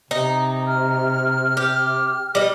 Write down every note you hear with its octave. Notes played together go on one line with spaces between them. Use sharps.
C3 D#4
F6
G4
G3 D#5